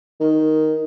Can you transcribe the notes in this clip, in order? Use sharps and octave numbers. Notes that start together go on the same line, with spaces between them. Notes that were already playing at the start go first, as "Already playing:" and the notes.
D#3